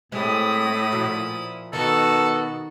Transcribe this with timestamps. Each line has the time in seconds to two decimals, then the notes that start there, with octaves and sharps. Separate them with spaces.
0.12 A2 G#3 C4 E4 G4 D#6
0.92 A#2 F3 F#4
1.73 B2 D#3 F#4 A4